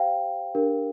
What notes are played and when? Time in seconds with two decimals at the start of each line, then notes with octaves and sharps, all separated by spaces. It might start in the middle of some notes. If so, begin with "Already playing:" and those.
Already playing: G4 C5 F5 G5
0.55 D4 G4 A#4